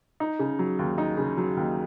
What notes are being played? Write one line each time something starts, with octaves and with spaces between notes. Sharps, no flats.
D#4
C#3
F#3
D#2
D#4
C#3
F#3
D#2